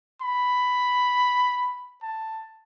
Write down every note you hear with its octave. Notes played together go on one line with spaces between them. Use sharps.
B5
A5